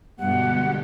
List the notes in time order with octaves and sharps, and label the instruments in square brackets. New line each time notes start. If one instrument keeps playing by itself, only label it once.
[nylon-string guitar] G2 G3 [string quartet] B2 [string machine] D3 G#3 G4 [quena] F#5